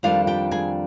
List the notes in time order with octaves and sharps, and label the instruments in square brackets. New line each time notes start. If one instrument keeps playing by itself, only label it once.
[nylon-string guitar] F2 D#3 G3 D4 F4 F5
G4 G5
G#4 G#5